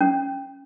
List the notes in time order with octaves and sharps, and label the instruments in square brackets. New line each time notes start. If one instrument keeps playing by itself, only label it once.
[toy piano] C#4